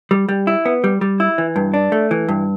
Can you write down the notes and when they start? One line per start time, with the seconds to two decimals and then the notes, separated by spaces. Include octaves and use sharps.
0.11 G3
0.29 G3
0.47 E4
0.65 B3
0.84 G3
1.01 G3
1.20 E4
1.38 E3
1.56 G2
1.74 D4
1.92 A3
2.11 E3
2.28 G2